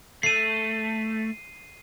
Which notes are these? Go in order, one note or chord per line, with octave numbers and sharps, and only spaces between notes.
A3 C7 D#7